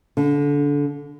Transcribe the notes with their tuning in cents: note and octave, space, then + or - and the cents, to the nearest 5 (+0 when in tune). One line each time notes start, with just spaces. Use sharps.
D3 -25